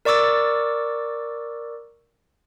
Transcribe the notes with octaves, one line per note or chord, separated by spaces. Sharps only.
A#4 D5 C#6 D6 E6 A6